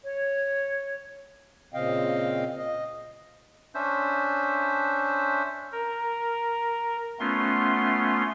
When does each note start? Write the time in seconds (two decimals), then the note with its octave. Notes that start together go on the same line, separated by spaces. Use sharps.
0.03 C#5
1.74 A#2 C#3 C4 D#5 F5 G5
2.57 D#5
3.75 C#4 D4 C5 E5
5.72 A#4
7.20 A3 B3 C#4 F4 C6